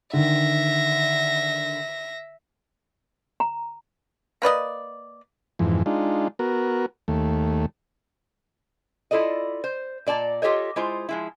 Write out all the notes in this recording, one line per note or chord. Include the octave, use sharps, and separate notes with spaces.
D3 D#3 E5 A#6
A#5
A#3 B4 D5 D#5
F2 G#2 E3
G#3 D4 D#4 F4
B3 F#4 A#4
D#2 A3
E4 F4 A4 D5 D#5
C5
A#2 D5 A5 A#5
F4 G4 A4 C#5 D#5
G#3 E4 F4 C5
F3 G#3 E4